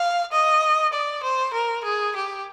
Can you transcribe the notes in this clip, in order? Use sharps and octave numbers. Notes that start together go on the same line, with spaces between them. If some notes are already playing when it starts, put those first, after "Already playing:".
Already playing: F5
D#5
D5
C5
A#4
G#4
G4